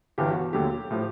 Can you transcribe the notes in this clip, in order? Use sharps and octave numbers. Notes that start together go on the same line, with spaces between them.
G1 G2 E3 G4
F#4
D#2 D3 F#3 A3 G4
A2 F3